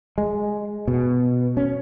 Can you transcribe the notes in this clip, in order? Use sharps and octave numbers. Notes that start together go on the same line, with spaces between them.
G#3
B2
C#4